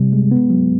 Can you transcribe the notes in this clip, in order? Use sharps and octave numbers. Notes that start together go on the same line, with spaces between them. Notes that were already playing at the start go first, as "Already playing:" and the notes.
Already playing: C3 G3
G#3
B3
F#3